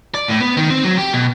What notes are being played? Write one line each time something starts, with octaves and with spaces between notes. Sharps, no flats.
D5
A2
B3
D#3
C4
F#3
G4
B2